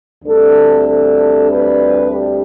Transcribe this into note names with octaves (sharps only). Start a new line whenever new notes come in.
D2 C3 G3 D4 A4
A4
B4
G4